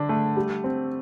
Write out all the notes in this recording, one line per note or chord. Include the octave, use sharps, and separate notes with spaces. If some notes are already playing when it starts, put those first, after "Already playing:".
Already playing: D3 D4
A3
G3
C4